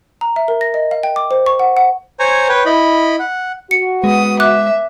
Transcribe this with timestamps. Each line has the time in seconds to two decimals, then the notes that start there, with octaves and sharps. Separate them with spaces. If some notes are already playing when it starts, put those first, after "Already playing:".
0.21 A#5
0.36 E5
0.48 A#4
0.61 A#6
0.74 D#5
0.91 F5
1.03 G5
1.16 D6
1.31 C5
1.46 C#6
1.59 F#5
1.77 F#5
2.20 C5 C#5 G#5 A#5 C#6
2.49 B4 C#5 G5
2.66 E4 D#5 B5
3.19 F#5
3.71 F#4 C#7
4.04 G#3 B3 D#6
4.40 E5 D6 F#6